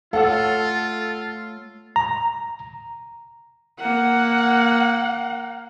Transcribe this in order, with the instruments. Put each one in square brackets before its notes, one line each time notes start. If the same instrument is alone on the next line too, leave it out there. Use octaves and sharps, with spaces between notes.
[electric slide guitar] A3 C#5 [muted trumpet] F4 [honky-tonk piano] A4 [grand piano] F5 F#5 E6
[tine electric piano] A#5
[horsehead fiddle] A#3 F#5